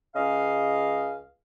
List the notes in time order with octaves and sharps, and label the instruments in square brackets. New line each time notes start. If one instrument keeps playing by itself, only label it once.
[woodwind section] C#2 C#3 D#5 F5